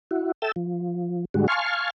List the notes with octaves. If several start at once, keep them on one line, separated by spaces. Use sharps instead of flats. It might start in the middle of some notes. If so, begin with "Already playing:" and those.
E4 F#4
A4 E5 G5 A5 E6
F3
G#2 D3 G3 G#3 F#4
F5 G#5 A5 C6 C#6 F6